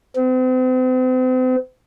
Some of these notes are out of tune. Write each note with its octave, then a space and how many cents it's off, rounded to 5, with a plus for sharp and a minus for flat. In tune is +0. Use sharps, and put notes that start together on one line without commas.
C4 -40